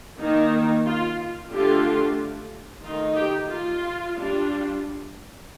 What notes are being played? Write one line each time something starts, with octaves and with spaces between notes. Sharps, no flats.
D#3 A#3 D#4
F4
D3 A3 D4 F4 G4
D#3 A3 D#4 F4
G4
F4
G3 D4 F4